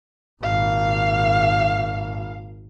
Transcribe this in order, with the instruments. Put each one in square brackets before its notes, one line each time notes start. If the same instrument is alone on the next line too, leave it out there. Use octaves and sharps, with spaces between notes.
[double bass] G#1 A#2 [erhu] F5